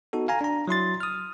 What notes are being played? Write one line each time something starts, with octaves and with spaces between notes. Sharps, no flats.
B3 D#4 F#4 A4
F5 G#5 A#5
D4 A#5
F#3 E4 C6 A6
D#6 F6